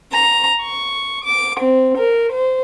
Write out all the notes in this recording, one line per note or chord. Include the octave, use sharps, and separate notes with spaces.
A#5
C#6
D6
C4
A#4
C5